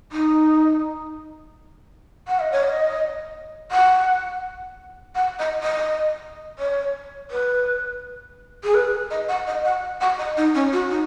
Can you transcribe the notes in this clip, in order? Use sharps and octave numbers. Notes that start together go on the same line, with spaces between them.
D#4
F#5
D#5
C#5
D#5
F#5
F#5
D#5
D#5
C#5
B4
G#4
B4
D#5
F#5
D#5
F#5
F#5
D#5
D#4
C#4
F#4
D#4